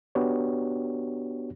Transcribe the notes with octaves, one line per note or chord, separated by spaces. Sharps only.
B3 D4 F#4 G4 C#5